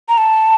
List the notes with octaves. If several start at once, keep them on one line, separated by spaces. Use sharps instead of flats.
A#5
A5